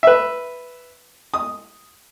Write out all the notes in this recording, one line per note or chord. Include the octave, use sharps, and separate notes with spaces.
B4 E5
D#6